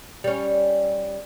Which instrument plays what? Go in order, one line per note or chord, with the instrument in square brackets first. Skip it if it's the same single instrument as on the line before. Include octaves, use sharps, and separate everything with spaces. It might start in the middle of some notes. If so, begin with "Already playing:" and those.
[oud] G3 C#4